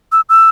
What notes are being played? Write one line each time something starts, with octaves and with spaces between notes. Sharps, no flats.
E6
E6